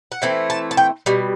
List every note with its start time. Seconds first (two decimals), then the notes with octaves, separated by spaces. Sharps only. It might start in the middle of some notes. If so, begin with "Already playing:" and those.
0.12 F#5
0.22 E3 A3 C4 E4 G5
0.50 A5
0.71 A5
0.77 G5
1.06 B2 G3